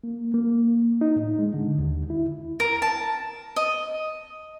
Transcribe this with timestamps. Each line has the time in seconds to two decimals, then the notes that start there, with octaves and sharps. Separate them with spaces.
0.04 A#3
0.34 A#3
1.01 D#4
1.16 A2
1.39 G#3
1.54 D3
1.78 D#2
2.10 E4
2.60 A#4
2.82 A5
3.56 D#5